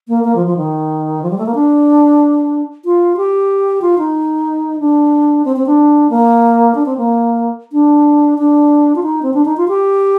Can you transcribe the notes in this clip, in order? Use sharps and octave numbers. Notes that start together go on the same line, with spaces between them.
A#3
A#3
F3
F3
D#3
F3
G3
A3
A#3
D4
F4
G4
F4
D#4
D4
C4
C4
D4
A#3
D4
C4
A#3
D4
D4
F4
D#4
C4
D4
D#4
F4
G4